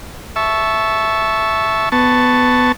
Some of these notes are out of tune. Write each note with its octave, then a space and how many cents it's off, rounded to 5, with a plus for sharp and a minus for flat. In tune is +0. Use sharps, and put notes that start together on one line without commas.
E5 +0 A5 -15 C#6 +0
B3 +15 A5 +0 C#6 +0